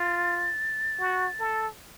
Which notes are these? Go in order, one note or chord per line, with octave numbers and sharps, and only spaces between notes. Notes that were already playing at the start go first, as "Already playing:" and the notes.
Already playing: F4 A6
F#4
A4